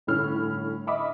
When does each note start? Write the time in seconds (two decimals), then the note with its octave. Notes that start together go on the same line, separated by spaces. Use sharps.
0.07 G1 A2 C#4 F6
0.87 D#5 E5 B5 D6 D#6